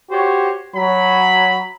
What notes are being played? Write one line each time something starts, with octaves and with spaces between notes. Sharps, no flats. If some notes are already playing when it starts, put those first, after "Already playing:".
F#4 G4 C5 C#5
F#3 B5